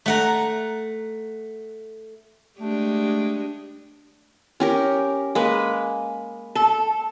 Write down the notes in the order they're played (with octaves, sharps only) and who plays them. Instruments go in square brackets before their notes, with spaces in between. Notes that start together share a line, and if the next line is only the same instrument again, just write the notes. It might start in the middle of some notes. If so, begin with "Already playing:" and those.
[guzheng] A3 F#5 A#5
[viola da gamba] G#3 D4 G4 [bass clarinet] A3
[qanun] C#4 G4 A#4
G#3 A#3 B4
[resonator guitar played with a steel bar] A4